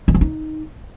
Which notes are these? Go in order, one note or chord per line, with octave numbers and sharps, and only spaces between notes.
E3
F3
D#4